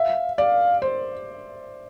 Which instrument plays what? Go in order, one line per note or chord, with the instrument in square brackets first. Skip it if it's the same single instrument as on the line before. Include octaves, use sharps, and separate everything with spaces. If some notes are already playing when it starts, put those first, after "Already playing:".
Already playing: [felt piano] E5 [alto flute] F5
[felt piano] D5 [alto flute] F5
[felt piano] C5